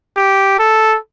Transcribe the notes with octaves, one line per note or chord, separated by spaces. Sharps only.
G4
A4